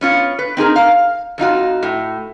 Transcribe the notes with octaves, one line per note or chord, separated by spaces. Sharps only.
B3 C#4 F4 C#5
B4
C4 D#4 G#4 A#4
F5
F2 D#4 F4 F#4
A2